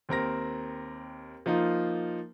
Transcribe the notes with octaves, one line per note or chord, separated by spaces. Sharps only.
D#2 C4 A#4 A#6
F3 A#3 D#4 F4